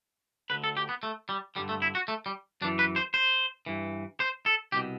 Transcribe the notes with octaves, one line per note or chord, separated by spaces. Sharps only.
D2 D3 B4
A4
G4
B3
A3
G3
G2 D3 G3
A3
E4
F#4
A3
G3
F#2 E3 D4
B4
C5
C5
G2 E3
C5
A4
C2 B2 G4